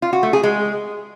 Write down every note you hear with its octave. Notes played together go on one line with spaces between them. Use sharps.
F4
F#4
A3
G#4
G#3